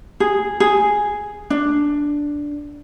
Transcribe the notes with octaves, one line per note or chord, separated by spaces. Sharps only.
G#4
G#4
D4